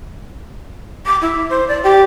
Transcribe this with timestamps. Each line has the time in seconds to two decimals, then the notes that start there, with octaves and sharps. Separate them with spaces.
1.06 D6
1.22 E4
1.50 C5
1.68 D5
1.84 G4